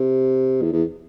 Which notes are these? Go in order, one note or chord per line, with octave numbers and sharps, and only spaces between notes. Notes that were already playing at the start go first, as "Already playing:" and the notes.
Already playing: C3
E2
E2